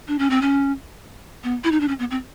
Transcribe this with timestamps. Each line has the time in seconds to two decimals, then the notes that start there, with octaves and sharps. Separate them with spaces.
0.08 D4
0.19 C#4
0.30 C4
0.41 C#4
1.44 B3
1.64 E4
1.72 D#4
1.80 D4
1.88 C#4
1.99 B3
2.11 C4